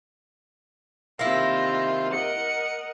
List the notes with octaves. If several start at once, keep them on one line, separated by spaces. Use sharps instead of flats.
C3 D#3 A#3 E4 F4 A#6
A#4 D#5 F#5 C#7